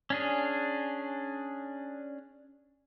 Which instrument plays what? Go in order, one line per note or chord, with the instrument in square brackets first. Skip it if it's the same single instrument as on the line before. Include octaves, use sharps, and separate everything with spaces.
[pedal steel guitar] C#4 D4 G#4